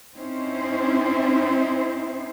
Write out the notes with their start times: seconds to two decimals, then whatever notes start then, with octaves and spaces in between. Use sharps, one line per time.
0.14 C4 C#4 D#4 E4 C5